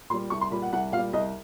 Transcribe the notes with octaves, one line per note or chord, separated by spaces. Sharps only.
A#2 G3 C6
C2 C#6
C6
A#2 G3 B5
F#5
C2 F#5
A#2 F5
G3
C2 D#5